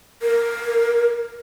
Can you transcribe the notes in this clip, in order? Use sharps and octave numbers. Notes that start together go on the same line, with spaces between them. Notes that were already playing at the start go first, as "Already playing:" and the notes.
A#4